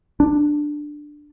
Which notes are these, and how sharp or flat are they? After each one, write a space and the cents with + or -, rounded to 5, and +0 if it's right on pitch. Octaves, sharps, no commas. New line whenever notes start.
D4 +10